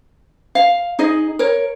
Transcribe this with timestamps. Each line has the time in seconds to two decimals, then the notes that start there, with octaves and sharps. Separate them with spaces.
0.55 F5
0.99 D#4 G#4 D#5
1.39 A#4 C#5